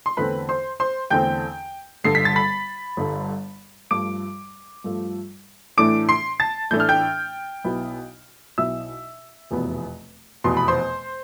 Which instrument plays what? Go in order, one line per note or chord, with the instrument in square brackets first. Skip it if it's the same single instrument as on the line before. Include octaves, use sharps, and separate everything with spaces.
[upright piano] C6
E2 D3 A3 C4 B4 B5
C5 C6
C5 C6
E2 D3 A3 C4 G5 G6
G1 G2 D3 C7
B6
A6
B5 B6
G1 G2 D3
G2 F3 A3 D6 D7
G2 F3 A3
A2 E3 A3 D4 D6 D7
C6 C7
A5 A6
A2 E3 A3 D4 G6
F6
G5 G6
B1 B2 B3 E4
B1 B2 B3 E4 E5 E6
F1 E2 B2 B3
F1 E2 B2 B3 C6
B5
C5 C6